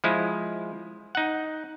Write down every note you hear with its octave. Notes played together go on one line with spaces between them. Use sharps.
F3 G#3 E4
D#4 F#5